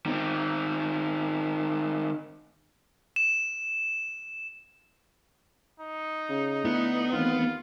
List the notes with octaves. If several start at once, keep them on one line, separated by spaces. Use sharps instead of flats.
D#3 C4
E7
D#4
C#3
D3 A3 B3 E4
D#2 E3 A3 C4 F4